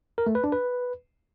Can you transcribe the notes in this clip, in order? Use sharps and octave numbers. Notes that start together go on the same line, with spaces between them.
A#4
A3
B4
D4
B4